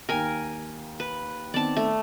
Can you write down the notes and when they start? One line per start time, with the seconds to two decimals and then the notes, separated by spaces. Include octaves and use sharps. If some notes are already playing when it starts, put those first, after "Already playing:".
0.09 D#2 A#4 G5 G#5
1.00 B4
1.54 D#3 B3 C4 D5 A5
1.77 A3